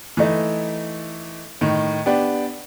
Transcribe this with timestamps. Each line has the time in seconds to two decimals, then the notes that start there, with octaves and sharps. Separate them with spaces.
0.17 E3 A3 D#4
1.61 A2 D#3
2.06 B3 D4 G4